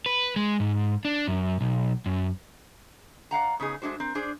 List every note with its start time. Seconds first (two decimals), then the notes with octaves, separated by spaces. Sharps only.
0.06 B4
0.36 G#3
0.60 G#2
1.05 D4
1.27 F#2
1.61 B1
2.06 F#2
3.31 D5 F5 F#5 A#5
3.60 C#3 B3 D#4 G#4
3.82 G#3 A3 D4 F#4 C5
4.00 C4 A#4
4.15 D4 G#4 C5 D5